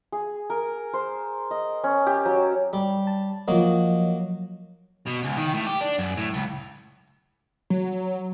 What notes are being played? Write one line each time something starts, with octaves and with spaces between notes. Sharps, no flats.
G#4
A#4
C5
D#5
C#4
G4
F#3
G3
A5
F3 F#3 A#3 F#4 C#5 D#5
B2
C#2
D#3
A2
G4
D4
F#2
A2
C#2
F#3